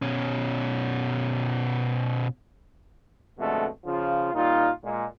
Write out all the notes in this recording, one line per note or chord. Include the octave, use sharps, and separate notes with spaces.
B2 C#4
F2 B2 D3 G#3 A3
C#3 F3 F4
A#2 G3 D#4 F4
A#2 G#3